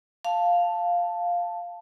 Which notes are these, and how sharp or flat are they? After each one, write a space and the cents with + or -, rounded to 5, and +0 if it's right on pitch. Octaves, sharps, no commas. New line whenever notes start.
F5 +0 A5 +0